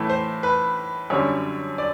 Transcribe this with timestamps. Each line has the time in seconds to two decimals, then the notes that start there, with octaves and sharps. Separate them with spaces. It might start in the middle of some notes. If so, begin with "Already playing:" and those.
Already playing: A2 E3 A3
0.09 C5
0.43 B4
1.10 F#2 D3 G3 C#5
1.78 D5